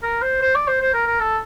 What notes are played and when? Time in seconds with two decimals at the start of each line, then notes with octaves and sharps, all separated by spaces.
0.03 A#4
0.22 C5
0.42 C5
0.55 D5
0.68 C5
0.81 C5
0.94 A#4
1.07 A#4
1.20 A4